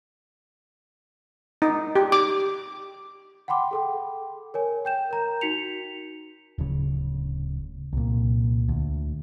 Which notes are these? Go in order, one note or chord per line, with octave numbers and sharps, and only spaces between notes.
D#4
G4
D6
F#5 G5 B5 C6 D6
G#4 A4 G5
A#4 C#5 G#5
G5 G6 E7
A#4 A#5 G6
D#4 F#4 B6 C#7 F7
D1 C#3
C2 A#2
D2